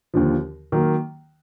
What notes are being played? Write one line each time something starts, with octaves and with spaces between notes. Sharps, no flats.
D#2 D3 F3
D#3 F#3 A#3